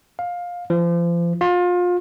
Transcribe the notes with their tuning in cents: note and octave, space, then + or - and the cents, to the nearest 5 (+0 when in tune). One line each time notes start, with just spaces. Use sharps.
F5 +15
F3 -35
F4 +30